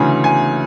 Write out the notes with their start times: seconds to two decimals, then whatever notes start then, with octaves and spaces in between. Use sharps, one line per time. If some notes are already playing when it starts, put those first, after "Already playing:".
Already playing: D2 C#3 E3 G#5
0.24 G#5